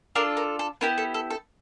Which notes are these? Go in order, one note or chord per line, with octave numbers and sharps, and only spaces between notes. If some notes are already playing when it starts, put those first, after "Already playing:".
D4 F4 A4 A#4
A#4
A4
B3 E4 G4 A#4
A4
A4
A4